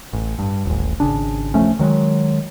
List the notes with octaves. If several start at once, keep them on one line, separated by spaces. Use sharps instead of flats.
A1
G2
D#1 A1
G#1 C#3 D4
D#1 F3 A3 C#4
D#3 F#3 G#3